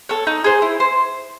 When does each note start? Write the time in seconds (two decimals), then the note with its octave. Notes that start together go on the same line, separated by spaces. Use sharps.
0.09 A4 C#5
0.27 D#4
0.44 G#4 C5
0.62 E4
0.80 C5